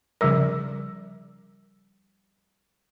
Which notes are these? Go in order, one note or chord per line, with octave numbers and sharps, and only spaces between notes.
C#3 F3 G3 A#4 D5